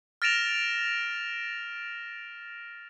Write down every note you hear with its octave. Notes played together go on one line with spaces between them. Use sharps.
F6 A6 A#6 D7 E7 F7